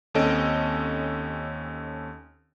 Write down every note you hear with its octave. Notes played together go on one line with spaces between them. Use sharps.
D#2 C4 C#4 A4 D#5 D7